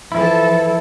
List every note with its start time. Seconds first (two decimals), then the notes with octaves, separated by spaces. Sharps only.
0.12 E3 F3 E4 A4